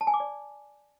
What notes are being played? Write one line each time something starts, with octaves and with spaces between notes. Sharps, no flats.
A5
G#5
D6
D5